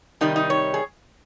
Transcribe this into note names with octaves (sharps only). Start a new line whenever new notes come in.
C3 D#3 G3 D#4
D#4
C#5
G#4